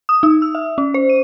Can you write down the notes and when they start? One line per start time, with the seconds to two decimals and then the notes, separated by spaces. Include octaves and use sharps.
0.09 D#6
0.23 D#4
0.42 E6
0.55 E5
0.78 C#4
0.94 C5
1.10 D#7